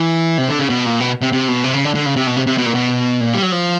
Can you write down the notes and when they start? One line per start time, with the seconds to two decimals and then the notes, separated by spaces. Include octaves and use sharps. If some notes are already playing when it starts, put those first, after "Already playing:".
Already playing: E3
0.38 C3
0.48 D3
0.59 C#3
0.70 B2
0.86 A#2
1.00 B2
1.22 C3
1.33 C3
1.48 B2
1.64 C3
1.74 C#3
1.85 D3
1.95 D3
2.06 C#3
2.16 C3
2.27 B2
2.36 C3
2.47 C3
2.58 B2
2.66 A#2
2.74 B2
3.20 A#2
3.34 G3
3.42 F#3
3.52 F3